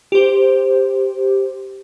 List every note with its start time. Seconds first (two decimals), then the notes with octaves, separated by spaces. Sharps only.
0.12 G4 C5